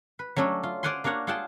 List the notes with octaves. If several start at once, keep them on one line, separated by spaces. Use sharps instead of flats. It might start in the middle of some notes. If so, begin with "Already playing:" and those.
B4
F#3 A3 C#4 D4 A4
F4
C5 D5 F5 F#5 G#5 C6
A#3 D4 A#4 C#5 F#5
F4 G#4 F#5 G5 A5